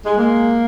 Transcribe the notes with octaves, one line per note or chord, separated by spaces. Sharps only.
G#3
G#3 A#3